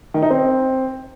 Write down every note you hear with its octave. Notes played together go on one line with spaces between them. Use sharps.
D#3
D#4
C4